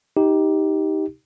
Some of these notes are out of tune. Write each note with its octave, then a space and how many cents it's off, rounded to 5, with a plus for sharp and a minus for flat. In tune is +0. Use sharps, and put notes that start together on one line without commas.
D#4 +15 G4 +0